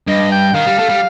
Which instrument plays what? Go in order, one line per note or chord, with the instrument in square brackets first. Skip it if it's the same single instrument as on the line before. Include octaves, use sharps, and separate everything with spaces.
[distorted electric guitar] G2 [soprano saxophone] D#5
[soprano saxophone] G5
[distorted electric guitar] D#3 [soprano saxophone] F5
[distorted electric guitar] G3
A3
G3